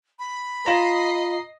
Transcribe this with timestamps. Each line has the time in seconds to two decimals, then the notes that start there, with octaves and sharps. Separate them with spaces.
0.19 B5
0.66 F4 D#5 A#5 C7